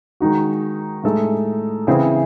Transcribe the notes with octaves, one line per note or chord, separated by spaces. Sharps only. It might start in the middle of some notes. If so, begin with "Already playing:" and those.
D#3 G#3 D#4 F#4
A2 G#3 D#4 A4
C#3 E3 C4 E4 G#4